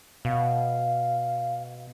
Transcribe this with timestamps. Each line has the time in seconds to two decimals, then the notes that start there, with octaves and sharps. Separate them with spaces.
0.25 B2 F5